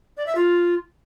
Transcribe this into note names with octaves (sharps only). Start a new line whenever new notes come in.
D5
E5
F4